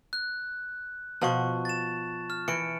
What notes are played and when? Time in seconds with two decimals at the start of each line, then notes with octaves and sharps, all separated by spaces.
0.13 F#6
1.21 B2 F3 F#5 A5 C#6
1.65 A6 E7
2.30 F6
2.48 E3 C#7 D7